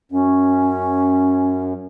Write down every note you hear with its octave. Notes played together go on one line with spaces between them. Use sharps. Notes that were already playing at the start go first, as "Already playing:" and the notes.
F#2 C#4